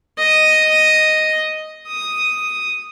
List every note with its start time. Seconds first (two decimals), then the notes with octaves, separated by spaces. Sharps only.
0.18 D#5
1.87 D#6